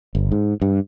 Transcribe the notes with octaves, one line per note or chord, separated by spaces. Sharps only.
G1
G#2
G2